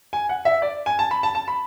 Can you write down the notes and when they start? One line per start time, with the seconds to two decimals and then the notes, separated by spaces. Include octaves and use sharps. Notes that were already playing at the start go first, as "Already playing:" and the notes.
0.13 G#5
0.29 F#5
0.45 E5
0.62 D5
0.86 G#5
0.99 A5
1.11 B5
1.23 A5
1.35 A5
1.48 B5